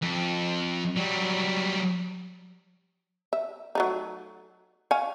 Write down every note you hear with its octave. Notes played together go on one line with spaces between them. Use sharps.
F2
F#3 G3
E5
F#3 A3 D#4
C#5 F5 G#5